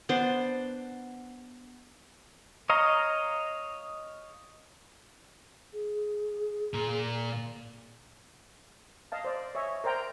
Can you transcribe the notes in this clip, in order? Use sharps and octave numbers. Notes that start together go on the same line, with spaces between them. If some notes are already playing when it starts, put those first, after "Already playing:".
B3 D4 C5
C#5 D#5 F5 A#5
G#4
A#2 A#4
D#5 F5 A5
C5 D5
C#5 D#5 E5 G#5
A#4 C5 D5 G5 A#5